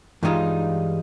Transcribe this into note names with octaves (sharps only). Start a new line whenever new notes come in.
G2 E3 G3 G#3 D#4 F4